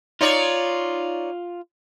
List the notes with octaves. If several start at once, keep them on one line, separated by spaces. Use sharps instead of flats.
D#4 F4 C#5 D5